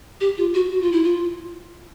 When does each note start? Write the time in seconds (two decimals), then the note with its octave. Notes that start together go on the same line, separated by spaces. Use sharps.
0.21 G4
0.37 F4
0.54 F#4
0.71 F#4
0.81 F4
0.92 E4
1.03 F4